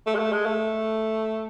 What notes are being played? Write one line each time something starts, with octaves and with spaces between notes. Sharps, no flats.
A3
G#3
A3
G#3
A3